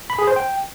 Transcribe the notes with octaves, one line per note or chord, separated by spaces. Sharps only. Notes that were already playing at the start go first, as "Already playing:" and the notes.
B5
G#4
C5
G5